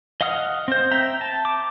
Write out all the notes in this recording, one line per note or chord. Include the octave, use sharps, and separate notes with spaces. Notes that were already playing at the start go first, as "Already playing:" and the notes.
D#5 F5 F#5 D#6 F6
C4 C5
E5 G5 A#5
A5
D6